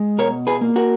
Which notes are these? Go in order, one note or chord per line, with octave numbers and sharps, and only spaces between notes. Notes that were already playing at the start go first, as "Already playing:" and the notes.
Already playing: G#3
B2 A#4 C#5
G#4 B4
A#3
F#4 A#4